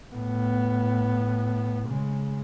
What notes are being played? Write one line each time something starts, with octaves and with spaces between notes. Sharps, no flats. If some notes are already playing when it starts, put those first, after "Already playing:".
A2 B3
C#3 G#3